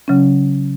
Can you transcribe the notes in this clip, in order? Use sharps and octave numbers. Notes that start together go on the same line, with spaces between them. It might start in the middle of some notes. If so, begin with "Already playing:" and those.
C#3 F#3 C#4